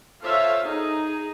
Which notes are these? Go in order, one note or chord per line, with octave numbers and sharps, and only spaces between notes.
F4 A4 C5 C#5 E5 F5
D#4 G#4